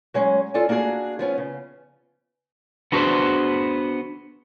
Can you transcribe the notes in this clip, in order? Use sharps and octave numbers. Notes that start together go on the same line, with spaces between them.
F#3 G#3 C#4
F4 A4 D5 G#5
A#3 D4 F#4 G#4
F3 B3 C#4
C#3
B3 D4 F#4 G#4 B4 C5